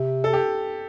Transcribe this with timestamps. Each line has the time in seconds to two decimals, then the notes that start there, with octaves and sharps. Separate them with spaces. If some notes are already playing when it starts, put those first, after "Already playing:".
Already playing: C3
0.24 A4
0.33 G4